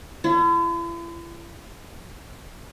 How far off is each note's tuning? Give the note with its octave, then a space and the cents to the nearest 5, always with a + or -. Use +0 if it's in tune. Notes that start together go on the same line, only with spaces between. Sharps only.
E4 +45